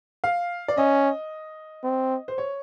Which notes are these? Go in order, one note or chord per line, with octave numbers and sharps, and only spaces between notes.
F5
D5
C#4 D#5
C4
C5
C#5